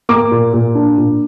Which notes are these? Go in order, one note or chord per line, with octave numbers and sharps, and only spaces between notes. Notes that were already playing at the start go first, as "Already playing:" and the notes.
A#3 D6
A#2
A#2
D4
A#2